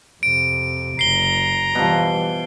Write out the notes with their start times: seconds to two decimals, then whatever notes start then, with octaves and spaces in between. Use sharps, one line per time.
0.23 F2 C3 D7
0.99 F#1 A#5 C7 G7
1.75 B2 E3 F3 G3